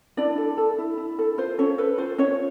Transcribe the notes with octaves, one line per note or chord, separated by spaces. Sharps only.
D4 E4 D5
A4
A4
E4
E4
A4
F4 C5
C#4 A4 C#5
A4 B4
F4 C5
C#4 F4 C#5